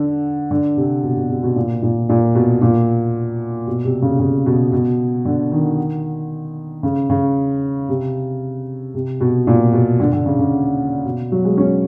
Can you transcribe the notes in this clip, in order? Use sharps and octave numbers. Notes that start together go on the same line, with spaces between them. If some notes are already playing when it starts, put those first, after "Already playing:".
Already playing: D3
D3
C3
B2
B2
C3
B2
A#2
A#2
A#2
B2
A#2
B2
C3
C#3
C#3
B2
B2
D3
D#3
C#3
C#3
C3
C3
B2
A#2
B2
D3
D3
C#3
C#3
B2
F#3
G#3
C#4